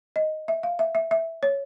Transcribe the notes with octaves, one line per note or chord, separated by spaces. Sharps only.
D#5
E5
F5
E5
E5
E5
C#5